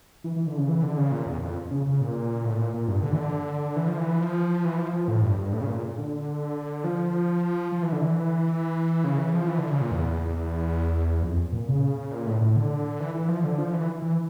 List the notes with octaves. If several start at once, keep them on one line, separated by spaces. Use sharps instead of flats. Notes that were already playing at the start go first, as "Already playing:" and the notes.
E3
E3
D3
C#3
E3
D3
C#3
A#2
E2
F2
C#3
C#3
A#2
A2
A#2
A#2
G2
D3
E3
D3
E3
F3
E3
F3
E3
F3
F3
A2
G2
G2
A2
C#3
A#2
D3
F3
F3
E3
D3
E3
C#3
E3
F3
E3
D3
C#3
A#2
E2
F2
A#2
C#3
A#2
A2
A2
D3
E3
E3
F3
D3
F3
E3
E3